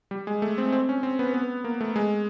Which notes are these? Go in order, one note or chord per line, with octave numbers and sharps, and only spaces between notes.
G3
G#3
A3
C4
C4
C#4
C4
B3
B3
A#3
A3
G#3